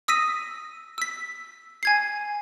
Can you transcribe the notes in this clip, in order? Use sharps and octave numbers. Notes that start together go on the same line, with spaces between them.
D#6 E6 A#6 B6 D#7
E6 B6
G#5 G#6 C7